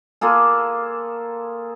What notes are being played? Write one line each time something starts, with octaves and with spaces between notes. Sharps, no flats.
A#3 F4 G#4 A4